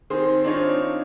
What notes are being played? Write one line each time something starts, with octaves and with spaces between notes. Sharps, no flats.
D#3 C4 G#4 C5 C6
C4 D4 D#4 F4 C#5